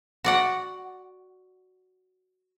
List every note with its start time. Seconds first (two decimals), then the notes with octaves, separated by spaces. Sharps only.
0.24 F#4 D5 F#5